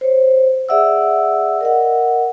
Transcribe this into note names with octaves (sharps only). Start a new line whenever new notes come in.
C5 C#5
G#4 D5 E5 F#5 E6
A#4 D#5 F#5